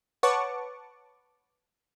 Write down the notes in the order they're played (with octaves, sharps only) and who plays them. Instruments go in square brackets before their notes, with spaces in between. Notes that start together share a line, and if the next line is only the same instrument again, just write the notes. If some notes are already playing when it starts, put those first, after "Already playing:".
[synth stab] B4 C#5 F#5 A5 C#6 D6